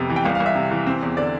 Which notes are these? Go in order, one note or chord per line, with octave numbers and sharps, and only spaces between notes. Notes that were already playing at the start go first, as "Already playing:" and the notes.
Already playing: F2 C3 B3
E3
G5
C2 F5
F5
C2
E5
C3
E3
C4
E2
D3 D5